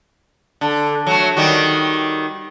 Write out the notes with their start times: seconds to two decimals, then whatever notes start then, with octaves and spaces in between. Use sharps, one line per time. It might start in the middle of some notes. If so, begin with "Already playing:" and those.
0.61 D3
1.07 F#3 A3
1.37 D#3 G3 F#4